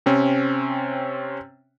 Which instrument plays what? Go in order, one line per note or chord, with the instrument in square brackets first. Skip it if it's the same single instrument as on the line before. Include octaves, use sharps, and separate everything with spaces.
[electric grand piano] C3 C4 C#4